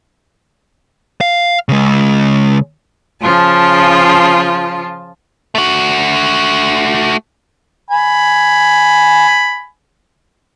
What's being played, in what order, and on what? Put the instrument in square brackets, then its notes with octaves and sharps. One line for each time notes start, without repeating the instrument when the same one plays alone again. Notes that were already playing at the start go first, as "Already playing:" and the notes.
[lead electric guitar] F5
C#3 G#3
[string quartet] C#3 F3 F4 A5
[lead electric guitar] A3 F#4
[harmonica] G#5 B5